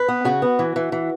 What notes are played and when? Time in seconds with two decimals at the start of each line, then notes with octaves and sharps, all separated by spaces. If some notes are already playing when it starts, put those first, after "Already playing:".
Already playing: B4
0.08 B3
0.25 C#3 F#4
0.42 B3
0.59 E3
0.76 E3
0.92 E3